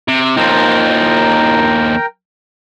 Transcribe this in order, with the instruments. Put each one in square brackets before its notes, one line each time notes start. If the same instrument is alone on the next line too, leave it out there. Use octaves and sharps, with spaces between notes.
[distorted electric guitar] C3
[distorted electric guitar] D#2 F3 [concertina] A#4 G5 A#5